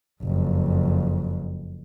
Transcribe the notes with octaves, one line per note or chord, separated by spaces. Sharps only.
F#1 F2